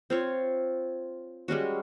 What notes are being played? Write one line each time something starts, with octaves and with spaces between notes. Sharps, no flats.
C4 F4 C#5
G3 G#3 C#4 F#4